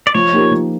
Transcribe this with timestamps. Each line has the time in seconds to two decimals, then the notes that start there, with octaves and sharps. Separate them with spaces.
0.07 D5
0.14 F3 C#5
0.33 A#3 D#4 G4 A#4
0.51 F3